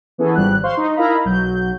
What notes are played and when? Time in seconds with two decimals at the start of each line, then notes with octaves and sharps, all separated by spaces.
0.18 E3 B3 C#4 E4 G#4 A4
0.35 G#1 F3 G3 F#6
0.63 C5 F5 C6 C#6
0.77 D#4
0.96 E4 A#4 D#5 F5 A#5 B5
1.25 B1 F#3 G6